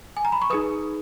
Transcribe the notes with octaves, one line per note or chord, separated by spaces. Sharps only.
G#5
A#5
B5
C#6
D#4 G#4 B4 D#6